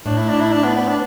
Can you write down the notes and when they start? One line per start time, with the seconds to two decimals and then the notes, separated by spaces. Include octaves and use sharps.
0.06 A2 D4
0.18 E4
0.29 D4
0.41 E4
0.53 D4
0.64 B3
0.76 B3
0.88 D4